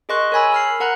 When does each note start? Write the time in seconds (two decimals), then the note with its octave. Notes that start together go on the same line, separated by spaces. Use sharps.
0.09 G#4 A#4 D#5 C6 C#6 F#6
0.32 A#4 C#5 G#5 B5 E6
0.52 B5 F6 C7
0.80 A#4 F#5 A#5 B5 F#6